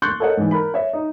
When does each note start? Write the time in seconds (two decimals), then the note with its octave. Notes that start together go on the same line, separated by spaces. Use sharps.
0.02 C6 C#6 E6 F#6 G6 A6
0.20 A4 A#4 C#5 D#5 F#5
0.37 G#2 E3
0.51 A#4 B5
0.74 C#5 E5
0.93 D#4